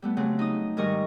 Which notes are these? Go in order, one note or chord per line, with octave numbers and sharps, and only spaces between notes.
G3 A3 B3
C#3 F#3 A3 C4
D#4 D#6
G#2 D#3 G3 A#4 D#5 C#6